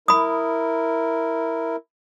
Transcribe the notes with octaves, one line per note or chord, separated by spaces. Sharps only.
E4 A#4 B5 D#6